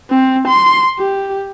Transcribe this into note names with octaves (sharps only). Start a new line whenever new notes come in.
C4
C6
G4